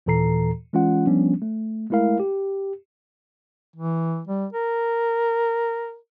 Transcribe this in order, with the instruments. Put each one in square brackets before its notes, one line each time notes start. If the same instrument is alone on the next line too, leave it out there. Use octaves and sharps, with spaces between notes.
[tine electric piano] D#2 A#2 E3 A4 A#5 C7
E3 G#3 C#4 F4 F#5
F3 G3 B3 C#4 D4
A3
G#3 A3 E4 A#4 F5
G4
[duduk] E3
G3
A#4